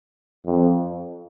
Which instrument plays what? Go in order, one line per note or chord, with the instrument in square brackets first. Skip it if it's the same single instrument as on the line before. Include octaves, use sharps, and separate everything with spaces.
[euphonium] F2